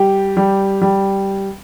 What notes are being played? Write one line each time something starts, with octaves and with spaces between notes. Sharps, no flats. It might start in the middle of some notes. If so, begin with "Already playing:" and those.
Already playing: G3 G4
G3
G3